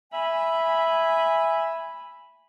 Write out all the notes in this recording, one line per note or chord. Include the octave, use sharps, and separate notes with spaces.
E5 G#5 B5